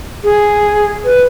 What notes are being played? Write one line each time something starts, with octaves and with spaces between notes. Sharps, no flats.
G#4
B4